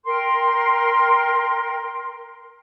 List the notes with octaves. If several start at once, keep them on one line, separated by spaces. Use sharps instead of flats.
A#4 G5 C6